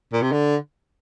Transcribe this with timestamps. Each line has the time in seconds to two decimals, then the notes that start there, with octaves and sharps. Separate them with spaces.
0.13 A#2
0.22 C3
0.32 D3